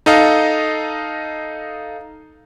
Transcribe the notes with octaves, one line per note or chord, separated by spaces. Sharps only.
D#4 A4 D#5 F5